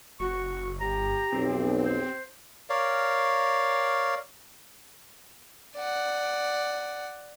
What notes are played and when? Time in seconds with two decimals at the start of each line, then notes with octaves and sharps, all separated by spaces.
0.20 F#1 F#4 C#6
0.80 G1 G4 A#5
1.32 B1 F2 C4
1.85 C5
2.70 A#4 C#5 D5 F5
5.76 D5 F#5